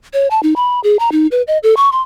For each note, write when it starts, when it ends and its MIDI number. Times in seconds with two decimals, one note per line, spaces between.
0.13 0.28 73
0.31 0.42 81
0.43 0.54 63
0.56 0.80 83
0.84 0.97 68
0.99 1.09 82
1.12 1.27 63
1.31 1.42 71
1.47 1.58 75
1.63 1.75 69
1.77 1.90 85
1.92 2.02 84